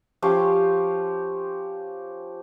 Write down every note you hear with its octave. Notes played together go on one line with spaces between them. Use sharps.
F3 C#4 G4 C6